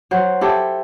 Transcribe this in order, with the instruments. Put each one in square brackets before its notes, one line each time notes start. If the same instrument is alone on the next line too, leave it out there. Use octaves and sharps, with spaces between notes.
[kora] F#3 C5
E4 G4 A4